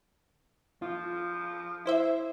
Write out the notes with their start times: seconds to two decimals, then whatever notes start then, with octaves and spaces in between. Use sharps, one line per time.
0.82 F3 F4
1.86 E4 C5 E5